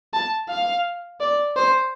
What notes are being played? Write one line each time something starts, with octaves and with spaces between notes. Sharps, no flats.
A5
F5
D5
C5